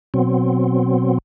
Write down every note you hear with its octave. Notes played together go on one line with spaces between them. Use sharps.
B2 F#3 C4